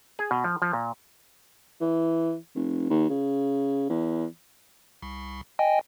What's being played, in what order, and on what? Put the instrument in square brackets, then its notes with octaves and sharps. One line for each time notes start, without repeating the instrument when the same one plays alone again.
[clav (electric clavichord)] G#4
B2
F3
F3
A#2
[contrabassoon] E3
F1
D#2
C#3
E2
[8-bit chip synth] C2
D#5 G5 G#5